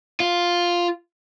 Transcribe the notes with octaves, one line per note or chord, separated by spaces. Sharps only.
F4